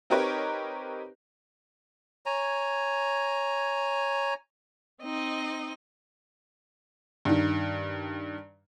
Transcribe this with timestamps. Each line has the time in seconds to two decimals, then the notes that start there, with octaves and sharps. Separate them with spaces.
0.10 C4 D#4 G4 A#4 B4 C#5
2.26 C#5 G#5 A#5
5.03 C4 D#4 D#5
7.25 G2 D#3